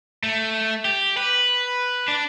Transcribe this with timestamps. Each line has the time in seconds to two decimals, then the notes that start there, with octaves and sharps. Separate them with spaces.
0.23 A3
0.85 G4
1.17 B4
2.08 D4